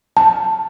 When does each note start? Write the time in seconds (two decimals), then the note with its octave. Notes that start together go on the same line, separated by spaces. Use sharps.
0.17 A5